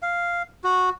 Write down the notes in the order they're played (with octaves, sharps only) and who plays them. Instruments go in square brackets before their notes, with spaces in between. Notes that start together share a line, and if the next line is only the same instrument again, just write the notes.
[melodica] F5
F#4